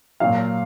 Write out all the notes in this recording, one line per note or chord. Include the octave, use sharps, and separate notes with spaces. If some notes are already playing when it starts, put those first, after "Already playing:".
A#2 F#3 F5